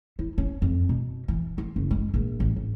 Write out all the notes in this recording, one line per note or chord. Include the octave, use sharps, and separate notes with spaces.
E4
C#4
F2
B2
E3
F4
F#1
G#3
A#1
A1
G#1